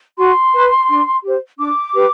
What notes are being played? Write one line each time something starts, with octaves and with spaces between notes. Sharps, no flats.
F#4 C6
B4
D4
G4 C5
D4 D6
G4 B4